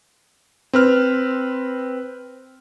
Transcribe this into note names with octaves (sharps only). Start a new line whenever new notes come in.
C4 B4 F6